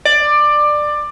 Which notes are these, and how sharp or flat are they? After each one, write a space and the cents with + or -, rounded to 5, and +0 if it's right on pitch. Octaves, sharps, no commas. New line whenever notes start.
D5 +15